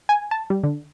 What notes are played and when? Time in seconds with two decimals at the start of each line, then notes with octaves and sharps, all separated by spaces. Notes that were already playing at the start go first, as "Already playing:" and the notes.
0.09 G#5
0.31 A5
0.50 G3
0.64 D3